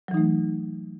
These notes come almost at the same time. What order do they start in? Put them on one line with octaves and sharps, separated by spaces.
F#3 E3 D#4 A3